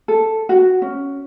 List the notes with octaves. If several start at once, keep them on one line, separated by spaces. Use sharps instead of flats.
A4
F#4
C#4